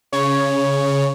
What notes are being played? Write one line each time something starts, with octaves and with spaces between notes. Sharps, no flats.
C#3 C#5